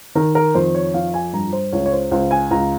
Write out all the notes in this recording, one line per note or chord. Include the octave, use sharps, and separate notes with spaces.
D#3 A#4
A#4
F2 C5
C#5
F3 F5
G#5
G2 A#5
C5
C#2 C#5
C#5
C5
C#2 C5
G#5
C#2 A#5